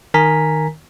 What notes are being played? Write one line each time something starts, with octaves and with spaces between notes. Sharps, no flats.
D#3 A#4 G#5 A#5 B6